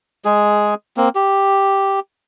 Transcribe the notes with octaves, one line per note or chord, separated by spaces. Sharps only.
G#3 G#4
A#3 C4
G4